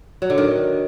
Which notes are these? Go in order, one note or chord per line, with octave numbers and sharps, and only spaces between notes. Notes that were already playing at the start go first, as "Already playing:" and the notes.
F#3
D3
D#3